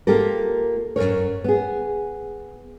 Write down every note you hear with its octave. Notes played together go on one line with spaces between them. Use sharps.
A#3 F4 G4 A4 A#4
F#2 C#3 A#4 C#5
B3 G#4